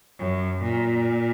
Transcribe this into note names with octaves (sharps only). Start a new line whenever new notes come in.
F#2
A#2